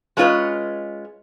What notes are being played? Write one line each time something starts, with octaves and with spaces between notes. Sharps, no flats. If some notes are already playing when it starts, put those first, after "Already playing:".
G#3 A3 C#4 F4 B4 D#5